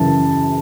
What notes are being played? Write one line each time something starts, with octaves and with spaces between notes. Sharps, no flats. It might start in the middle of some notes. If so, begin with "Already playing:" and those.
Already playing: F#2 C#3 E3 A5